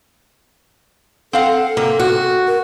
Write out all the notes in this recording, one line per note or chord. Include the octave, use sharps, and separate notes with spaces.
C4 A4 F5 F#5
C3 A#3
F#4
A#4